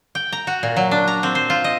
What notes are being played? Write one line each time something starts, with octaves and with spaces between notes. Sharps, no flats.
G5
A#5
F#4
A#2
F#3
D4
A#5
C4
C5
F4
D#5